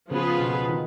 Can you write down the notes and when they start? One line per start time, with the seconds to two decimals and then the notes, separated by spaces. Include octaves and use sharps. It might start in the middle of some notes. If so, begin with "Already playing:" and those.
0.11 C#3 F3 B3 F4 G#4 B4
0.39 B2
0.69 D#3